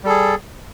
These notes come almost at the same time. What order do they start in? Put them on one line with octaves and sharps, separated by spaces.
G3 A4 G#4